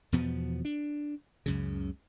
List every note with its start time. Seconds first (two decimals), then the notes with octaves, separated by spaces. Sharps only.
0.12 E2 B2 F3 B3
0.65 D4
1.46 C#2 F#2 C#3